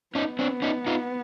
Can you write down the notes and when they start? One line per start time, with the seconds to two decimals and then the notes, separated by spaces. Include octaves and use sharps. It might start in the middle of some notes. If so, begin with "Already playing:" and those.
0.15 B3 C#4 D#4
0.39 C4 D4
0.62 C#4 D#4
0.87 D#4 F4